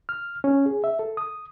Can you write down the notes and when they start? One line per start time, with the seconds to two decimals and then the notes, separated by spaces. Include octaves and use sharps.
0.09 F6
0.44 C#4
0.66 G#4
0.84 E5
0.99 A4
1.17 D#6